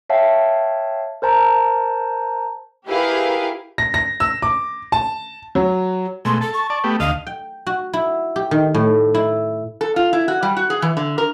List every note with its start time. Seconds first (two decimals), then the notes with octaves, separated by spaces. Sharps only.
0.10 C#5 E5 F5 G5 A5
1.22 A#4 C5 A5 A#5
2.88 E4 G4 G#4 A#4 B4 F5
3.78 A#6
3.94 A#6
4.20 E6
4.42 D6
4.92 A5
5.55 F#3
6.25 B2 G#3 A3 C6
6.41 A4 A5
6.53 C#6
6.70 D5 A5
6.84 A3 B3 G4
7.00 D2 D#5 F5 F6
7.27 G5
7.67 F#4
7.93 E4
8.36 G4
8.51 D#3
8.74 A2
9.15 E4
9.81 A4
9.96 F4
10.13 E4
10.28 F#4
10.43 G3
10.57 F#4
10.70 G#4
10.82 E3
10.97 D3
11.18 A#4